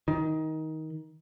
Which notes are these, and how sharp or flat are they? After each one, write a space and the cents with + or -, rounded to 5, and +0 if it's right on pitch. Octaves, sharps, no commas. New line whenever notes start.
D#3 +20